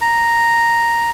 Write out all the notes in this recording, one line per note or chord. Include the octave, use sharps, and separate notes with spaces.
A#5